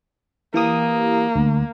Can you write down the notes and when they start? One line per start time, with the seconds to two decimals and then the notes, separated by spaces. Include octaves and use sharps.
0.54 E3 A#3 G4 D#6
1.36 D2